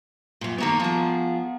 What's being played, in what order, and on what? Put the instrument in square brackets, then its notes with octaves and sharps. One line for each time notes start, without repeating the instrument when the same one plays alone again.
[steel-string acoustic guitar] F#2 A#2
[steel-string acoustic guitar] D#3 A#3 C#5 [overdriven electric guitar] B3 A#5
[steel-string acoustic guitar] F3 G#4